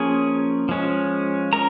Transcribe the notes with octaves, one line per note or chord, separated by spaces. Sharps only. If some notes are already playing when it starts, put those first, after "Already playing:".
Already playing: F3 A#3 C#4 G#4 G#5
F3 G#3 C#4
C#4 A#4 A#5